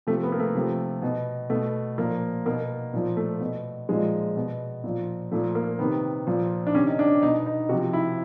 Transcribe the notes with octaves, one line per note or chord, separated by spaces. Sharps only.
C3 F3 A3
B3
A#3
A3
C3 F3
B2
B2 A3
A#2 F3 A#3
B2 A#3
A#2 F3
A3
B2
A#2 F3 G#3
B2
A#2 F3
A#2 F3 A3
A#3
C3 D#3 B3
A#2 F3
D4
C3 D#3 C#4
D#4
D4
B2 D#4
D#4
C3 F3 F#4
E4